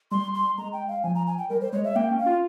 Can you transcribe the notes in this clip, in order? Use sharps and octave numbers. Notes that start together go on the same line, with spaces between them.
G3 C6
C6
G#3 A#5
G5
F5
F3 G#5
A#5
G#5
G5
G3 A#4
C5
G#3 C#5
E5
A#3 G5
C#4
F5
F4